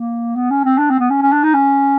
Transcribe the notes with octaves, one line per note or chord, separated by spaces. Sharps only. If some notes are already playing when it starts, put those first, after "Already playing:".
Already playing: A#3
B3
C#4
C4
D4
C4
B3
C#4
C#4
D4
D#4
C#4